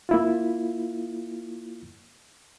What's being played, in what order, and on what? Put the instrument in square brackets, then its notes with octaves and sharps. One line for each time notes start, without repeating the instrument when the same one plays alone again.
[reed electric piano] A#3 E4 F4